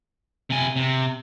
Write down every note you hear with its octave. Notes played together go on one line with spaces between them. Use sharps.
C3 G#5
C3